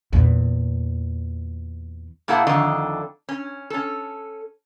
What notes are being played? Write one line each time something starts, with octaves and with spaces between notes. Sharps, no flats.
E2 A#2
A#2 A#3 E4 G#4 F#5 A5
F2 D3 D#3 D#5
C#4
C#4 A4